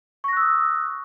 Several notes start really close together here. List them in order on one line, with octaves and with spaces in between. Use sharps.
C#6 A#6 F#6 E6 D#6